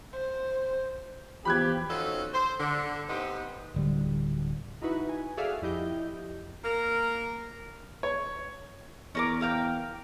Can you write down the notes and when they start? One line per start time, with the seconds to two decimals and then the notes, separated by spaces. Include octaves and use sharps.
0.13 C5
1.45 E2 F3 G4 B5 F#6 G#6
1.89 C4 C#4 D#4 F4 F#4 A4
2.34 C5
2.59 D3
3.08 B3 C4 D#4 G4 B4 C5
3.74 D1 D3 G3
4.82 D#4 E4 F#4 B4
5.09 G#5
5.37 F#4 G#4 A4 D5 E5 F5
5.62 F2 F3 E4 G4 D#5 G6
6.65 A#3 A#4
8.03 C#5
9.15 E2 C#4 A#4 D6
9.41 A#4 F5 G5